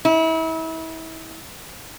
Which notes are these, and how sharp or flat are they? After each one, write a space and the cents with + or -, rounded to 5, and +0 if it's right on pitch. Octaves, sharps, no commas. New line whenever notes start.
E4 -35